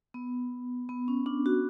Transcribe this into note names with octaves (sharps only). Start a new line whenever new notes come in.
B3
B3
C#4
D4
F#4